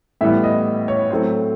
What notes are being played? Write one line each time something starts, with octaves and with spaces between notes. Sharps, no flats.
A2 E3 G3 B3 E5
D#5
C#5
A2 F#3 A3 C4 C5